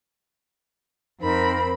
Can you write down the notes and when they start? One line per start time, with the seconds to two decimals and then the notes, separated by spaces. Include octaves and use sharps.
1.21 F2 C4 D#4 A#4 B5